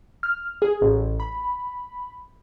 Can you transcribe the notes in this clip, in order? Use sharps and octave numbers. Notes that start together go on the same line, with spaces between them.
F6
G#4
A1
B5